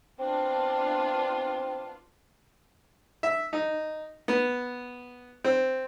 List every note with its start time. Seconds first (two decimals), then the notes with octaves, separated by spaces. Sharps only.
0.19 B3 C4 D4 F4
3.23 E5
3.53 D#4
4.28 B3
5.44 C4